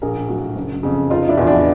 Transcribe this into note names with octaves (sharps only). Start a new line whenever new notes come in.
A#1 G#4 A#4
A2 F#3
F#1
F2 C#3
F1 D#4 F4
D4 E4
E2 B2 F4
D4 E4